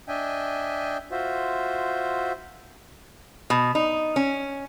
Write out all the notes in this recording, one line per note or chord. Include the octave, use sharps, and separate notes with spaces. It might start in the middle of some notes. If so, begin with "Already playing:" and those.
D4 D#5 E5 G5 G#5
F4 F#4 C5 E5
B2
D#4
C#4